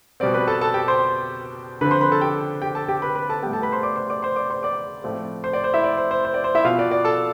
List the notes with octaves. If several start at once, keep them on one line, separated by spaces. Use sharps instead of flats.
B2 G3 C4 D5
B4 B5
A4 A5
A4 A5
G4 G5
C5 C6
D3 F3 C4 B4 B5
C5 C6
B4 B5
A4 A5
G4 G5
G4 G5
A4 A5
G4 G5
B4 B5
B4 B5
A4 A5
A2 G3 B3 G4 G5
A4 A5
B4 B5
C5 C6
D5 D6
C5 C6
D5 D6
C5 C6
D5 D6
C5 C6
D5 D6
A2 F3 A3 C4
C5 C6
D5
C5
E4 E5
D5
C5
C5
C5
D5
C5
E4 E5
B2 B3 F4 F5
D5
D5
A4 A5